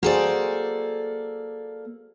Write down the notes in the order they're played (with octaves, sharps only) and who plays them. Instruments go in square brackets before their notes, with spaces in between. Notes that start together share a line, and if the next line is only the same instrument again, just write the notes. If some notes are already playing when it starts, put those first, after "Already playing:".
[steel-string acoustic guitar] A#3 A4 D5 [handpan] F#4 G#4 C5